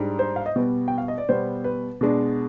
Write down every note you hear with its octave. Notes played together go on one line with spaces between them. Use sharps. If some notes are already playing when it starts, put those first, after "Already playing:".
Already playing: G#2 G3 D4
C5
F5
D#5
B2 G3 B3 D5
G5
F5
D#5
D5
B2 G3 B3 C5
B4
B2 G#3 D4